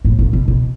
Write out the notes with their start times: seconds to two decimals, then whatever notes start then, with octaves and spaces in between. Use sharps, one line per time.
0.05 A2
0.19 A#2
0.33 B2
0.48 B2